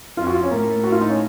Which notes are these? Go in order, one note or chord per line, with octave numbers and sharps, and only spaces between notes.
F2 F4
F#4
F4
C#4
A2 A#3
F#4
F4
D#4
C#4